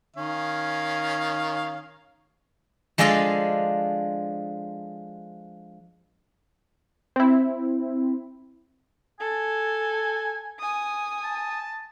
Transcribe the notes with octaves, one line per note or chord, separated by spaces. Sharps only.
D#3 C#4 F5
F3 G#3 D4 A4 D#5 F5
C4 E4
A4 G#5
G#5 D#6
A5